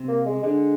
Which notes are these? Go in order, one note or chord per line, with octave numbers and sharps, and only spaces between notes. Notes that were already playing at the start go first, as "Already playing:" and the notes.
Already playing: C3
A#3
G#3
D3 G#3